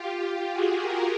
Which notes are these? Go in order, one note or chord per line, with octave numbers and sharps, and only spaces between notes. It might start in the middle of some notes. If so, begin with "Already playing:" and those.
Already playing: F4 G4
F#4 G#4
G#4 A#4